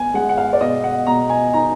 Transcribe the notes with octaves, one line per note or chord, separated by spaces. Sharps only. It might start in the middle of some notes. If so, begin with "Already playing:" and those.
Already playing: B3 G#5
G#3 F#5
F#5
F5
D5
B2 D#5
F#5
B2 A#5
G#5
D#4 A#5